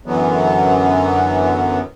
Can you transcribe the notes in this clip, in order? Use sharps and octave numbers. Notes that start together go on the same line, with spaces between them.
F#2 D3 E3 F#3 B3